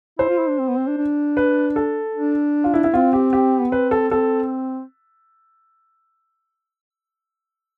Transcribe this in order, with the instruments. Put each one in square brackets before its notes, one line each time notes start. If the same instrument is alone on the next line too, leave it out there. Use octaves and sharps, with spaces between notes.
[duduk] E4 [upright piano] C5
[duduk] F4
E4
D4
C4
B3
C4
D4
D4
[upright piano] B4
A4
[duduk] D4
[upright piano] F4
E4
E4
[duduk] C4 [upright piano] F4
[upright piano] G4
G4
[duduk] B3
[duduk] C4 [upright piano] B4
[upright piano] A4
[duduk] C4 [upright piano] A4